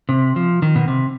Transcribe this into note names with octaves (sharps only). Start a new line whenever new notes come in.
C3
F3
D#3
B2
C3